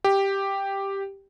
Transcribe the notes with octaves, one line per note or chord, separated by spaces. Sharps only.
G4